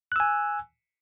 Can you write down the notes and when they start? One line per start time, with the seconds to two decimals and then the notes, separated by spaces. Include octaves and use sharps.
0.12 F#6
0.16 E6
0.20 G#5